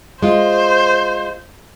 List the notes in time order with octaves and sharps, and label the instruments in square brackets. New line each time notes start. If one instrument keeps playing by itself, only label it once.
[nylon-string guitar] G#3 F4 [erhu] C5